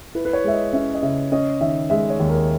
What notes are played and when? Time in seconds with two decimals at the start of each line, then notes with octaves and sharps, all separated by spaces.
0.15 E4 B4
0.25 B4
0.33 C#5
0.44 G#3 E5
0.53 D#5
0.73 C#4 E5
0.94 D#5
1.03 C#3 E5
1.32 C#4 D#5
1.61 D#3 E5
1.90 G#3 E5
2.10 C#5
2.20 D#2
2.30 A#4